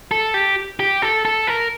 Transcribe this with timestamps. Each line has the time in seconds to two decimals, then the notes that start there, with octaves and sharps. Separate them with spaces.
0.11 A4
0.34 G4
0.80 G4
1.02 A4
1.25 A4
1.47 A#4